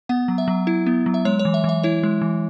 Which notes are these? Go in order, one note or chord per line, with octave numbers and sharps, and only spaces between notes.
B3 F#5
F#3
E5
F#3
E4
B3
F#3
E5
G#3 C#5
C#5
E3
E5
E3 E5
E4 C#5
G#3
E3